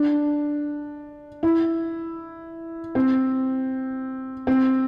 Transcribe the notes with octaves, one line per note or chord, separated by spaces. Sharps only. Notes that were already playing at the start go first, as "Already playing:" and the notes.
Already playing: D4
E4
C4
C4